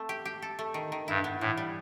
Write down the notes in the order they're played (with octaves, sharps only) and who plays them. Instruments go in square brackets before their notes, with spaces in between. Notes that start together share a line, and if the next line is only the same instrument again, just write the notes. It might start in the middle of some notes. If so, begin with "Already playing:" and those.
Already playing: [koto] A3 C4
G4
G4
A4
A3
D#3
D#3
[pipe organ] G2 [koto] E4
[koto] B3
[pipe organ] A2 [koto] E3
[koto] G3